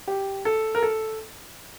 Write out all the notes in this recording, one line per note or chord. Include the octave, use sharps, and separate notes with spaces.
G4
A4
A#4
A4